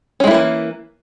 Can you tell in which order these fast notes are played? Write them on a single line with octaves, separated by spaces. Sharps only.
C#4 G#3 E4 A#3 E3